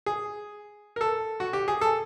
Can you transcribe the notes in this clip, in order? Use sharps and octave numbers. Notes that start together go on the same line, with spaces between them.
G#4
A#4
A4
F#4
G4
G#4
A4